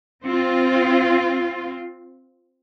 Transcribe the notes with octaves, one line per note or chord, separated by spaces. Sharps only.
C4 F4